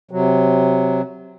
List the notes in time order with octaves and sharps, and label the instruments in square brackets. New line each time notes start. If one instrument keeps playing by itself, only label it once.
[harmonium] C3 F#3